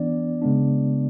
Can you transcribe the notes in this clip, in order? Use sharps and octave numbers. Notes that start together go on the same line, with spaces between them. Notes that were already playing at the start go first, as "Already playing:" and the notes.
Already playing: E3 B3 D4 D5
C#3 G#3 B3 D4